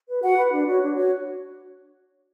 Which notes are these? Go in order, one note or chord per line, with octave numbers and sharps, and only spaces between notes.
B4
F#4 F#5
B4
D4
F#4 C#5
D4
F#4 C#5